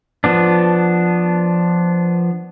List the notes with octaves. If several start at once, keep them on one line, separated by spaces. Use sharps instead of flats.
F3 B3 D4